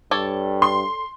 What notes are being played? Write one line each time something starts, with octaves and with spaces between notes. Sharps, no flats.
G2 A4 C#5 D5
C6